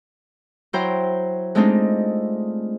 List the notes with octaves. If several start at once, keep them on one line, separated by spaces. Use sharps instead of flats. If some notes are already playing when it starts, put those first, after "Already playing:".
F#3 E4 C5 G5 A#5
G#3 A3 C4 D4 D#4 F4